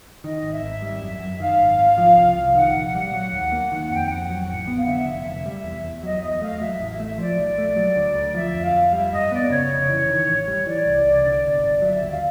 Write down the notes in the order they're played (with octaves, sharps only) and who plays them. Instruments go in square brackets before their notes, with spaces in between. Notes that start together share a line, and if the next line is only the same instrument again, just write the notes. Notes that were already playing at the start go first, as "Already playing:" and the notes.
[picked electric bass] D#3 [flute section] D#5
[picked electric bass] G#1
[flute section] E5
[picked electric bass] G#1
G3
F#2
F#2
[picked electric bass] D#3 [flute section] F5
[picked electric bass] G#1
G#1
F3
C2
C2
[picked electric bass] D#3 [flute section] F#5
[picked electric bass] A#1
G3
F#3
D#2
A#3
[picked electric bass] D#3 [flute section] F#5
[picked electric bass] F2 [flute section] G5
[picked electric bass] F2 [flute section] F#5
[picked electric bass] F#3
A1
B3
[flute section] F5
[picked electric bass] D3 [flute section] E5
[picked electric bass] F1
F1
G3
E2
E2
[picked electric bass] F#3 [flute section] D#5
[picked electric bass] E2 [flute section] D#5
[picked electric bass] A3 [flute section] F5
[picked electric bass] F#3 [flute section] E5
[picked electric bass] A1
[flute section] E5
[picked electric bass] A3
[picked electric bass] F3 [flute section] D5
[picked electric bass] B1
A3
F#3
D2
D2
[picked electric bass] F3 [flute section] E5
[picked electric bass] F2
[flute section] F5
[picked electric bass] F2
[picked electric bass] G3 [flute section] E5
[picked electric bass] G2 [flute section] D#5
[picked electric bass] B3 [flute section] D5
[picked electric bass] C#3 [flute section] C#5
[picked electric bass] F1
E3
D#3
A1
G3
[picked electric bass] E3 [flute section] D5
[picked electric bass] C2
C2
D3
G1
G1
[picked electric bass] F#3 [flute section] E5
[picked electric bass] D#2
[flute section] F5